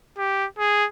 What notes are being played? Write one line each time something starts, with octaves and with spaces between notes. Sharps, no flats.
G4
G#4